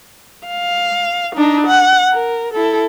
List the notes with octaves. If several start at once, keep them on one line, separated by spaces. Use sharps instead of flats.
F5
D4 D#4
F#5
A#4
E4 A4